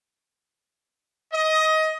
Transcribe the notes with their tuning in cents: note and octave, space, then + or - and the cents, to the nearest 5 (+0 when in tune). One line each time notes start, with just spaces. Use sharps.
D#5 +20